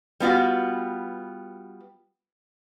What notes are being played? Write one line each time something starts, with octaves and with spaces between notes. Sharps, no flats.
G3 B3 F4 F#4